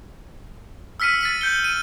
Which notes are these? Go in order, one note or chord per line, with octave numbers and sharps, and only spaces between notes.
E6 F6 B6 C#7 D#7
A6 B6 D#7
G6 C#7 G7
D#7